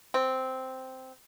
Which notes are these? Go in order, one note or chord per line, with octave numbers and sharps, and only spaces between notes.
C4